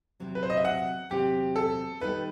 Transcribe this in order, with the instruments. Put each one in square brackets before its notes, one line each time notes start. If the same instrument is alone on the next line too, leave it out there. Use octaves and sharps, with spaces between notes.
[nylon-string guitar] E2 C3 F#3 C4
[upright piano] B4
C5
D#5
E5
F#5
[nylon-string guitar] E2 C3 F#3 C4 [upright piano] G4
[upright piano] A4
[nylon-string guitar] D#3 G3 B3 D#4 A4 [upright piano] B4